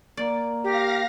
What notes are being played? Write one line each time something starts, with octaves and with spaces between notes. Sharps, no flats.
A#3 D5
G4 F5 A#6